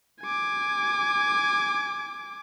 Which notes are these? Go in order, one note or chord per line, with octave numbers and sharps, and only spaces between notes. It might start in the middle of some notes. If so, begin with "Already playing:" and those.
G#5 D6